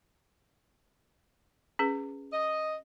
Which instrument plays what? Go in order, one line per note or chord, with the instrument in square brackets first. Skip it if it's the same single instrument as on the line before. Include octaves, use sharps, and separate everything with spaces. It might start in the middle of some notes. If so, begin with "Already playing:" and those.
[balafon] C#4 G#4 B4
[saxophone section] D#5